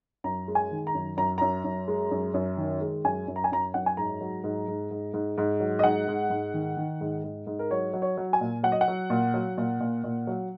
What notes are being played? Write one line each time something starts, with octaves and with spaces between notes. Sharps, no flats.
F#2 A#5
G#3
G#5
D#3
A#5
F#2
F#2 A#5
F#2 A#5
F#2
G#3
F#2
F#2
D#3
G#3
F#2 G#5
F#2
A#5
G#5
F#2 A#5
F#2 F#5
G#5
G#2 A#5
F#3
G#2
G#2
G#2
G#2
G#2
F#3
D#5
G#2 F#5
G#2
G#2
D#3
D#3
G#2
G#2
G#2
A#4
F#3 C#5
F#3
C#5
F#3
G#5
A#2
F#3 F#5
D#5
F#5
F#3
A#2
F#3
A#2
A#2
A#2
F#3